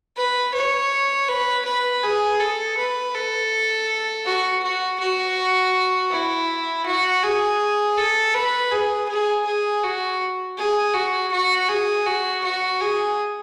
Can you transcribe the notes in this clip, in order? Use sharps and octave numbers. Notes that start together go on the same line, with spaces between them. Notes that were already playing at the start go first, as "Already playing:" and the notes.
B4
C#5
B4
B4
G#4
A4
B4
A4
F#4
F#4
F#4
E4
F#4
G#4
A4
B4
G#4
G#4
G#4
F#4
G#4
F#4
F#4
G#4
F#4
F#4
G#4